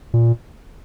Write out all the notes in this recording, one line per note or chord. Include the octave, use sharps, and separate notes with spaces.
A#2